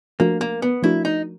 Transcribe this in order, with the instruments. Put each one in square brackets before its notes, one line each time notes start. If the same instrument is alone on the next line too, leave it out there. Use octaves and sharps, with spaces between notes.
[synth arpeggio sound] F3 A3 D4 F#4 A#4 [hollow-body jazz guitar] A#3
[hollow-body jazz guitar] A#3
B3
[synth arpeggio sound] F3 A3 D4 F#4 A#4 [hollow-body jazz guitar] E4
[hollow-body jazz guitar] D#4